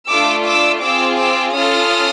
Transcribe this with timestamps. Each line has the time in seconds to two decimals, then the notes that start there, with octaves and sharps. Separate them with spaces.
0.10 A3 D4 F4 D6 E6
0.46 D6 E6
0.83 C4 F4 G#4 D6 E6
1.19 D6 E6
1.55 C#4 F4 A4 D#6 F6